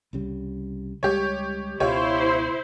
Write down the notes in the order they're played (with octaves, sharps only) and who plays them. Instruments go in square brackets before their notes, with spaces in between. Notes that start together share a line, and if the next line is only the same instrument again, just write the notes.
[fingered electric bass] C2 C#3 G3
[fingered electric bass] C#2 G3 G#3 [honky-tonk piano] G4 C#5
[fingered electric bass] C#2 B2 [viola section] E4 C5 [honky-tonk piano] F4 G4 C#5